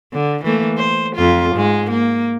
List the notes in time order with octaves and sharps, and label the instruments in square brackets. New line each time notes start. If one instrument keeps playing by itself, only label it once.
[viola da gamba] D3
E3 A3 A#3
C5
F2 F4
G#2 G#3
A#3